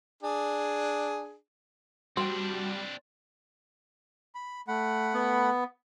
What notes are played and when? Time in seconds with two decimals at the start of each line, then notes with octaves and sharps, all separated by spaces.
0.23 D4 G#4
2.17 G3 C4 D4 F#4 G5 C6
4.35 B5
4.68 A3 F#5 B5
5.14 B3